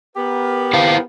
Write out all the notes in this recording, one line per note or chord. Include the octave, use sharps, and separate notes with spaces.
B3 G4 A#4
E4 C5 F5